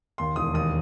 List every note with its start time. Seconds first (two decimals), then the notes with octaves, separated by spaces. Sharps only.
0.18 D#2 C6
0.36 E1 D#6
0.54 D#2 D#6